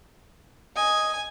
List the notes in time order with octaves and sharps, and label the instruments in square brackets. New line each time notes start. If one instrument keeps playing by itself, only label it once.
[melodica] D#5 [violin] G#5